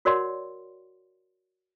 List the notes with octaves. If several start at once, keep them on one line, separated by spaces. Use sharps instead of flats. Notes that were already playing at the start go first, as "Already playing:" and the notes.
F#4 A#4 C#5 D5 F#5 C6